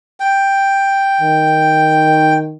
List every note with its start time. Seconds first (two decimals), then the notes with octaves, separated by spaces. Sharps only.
0.20 G5
1.21 D#3